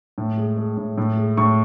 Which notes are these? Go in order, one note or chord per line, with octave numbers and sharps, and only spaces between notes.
A2
G#3
G#3
A2
A2
G#3
A2 C#6